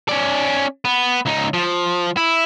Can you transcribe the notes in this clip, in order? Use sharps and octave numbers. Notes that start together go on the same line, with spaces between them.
C#4 D5
B3
C#2 D#4
F3
E4